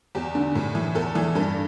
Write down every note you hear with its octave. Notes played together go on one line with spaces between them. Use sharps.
E2 G4
D3
A2
E3
E2 A4
E3
G2 A4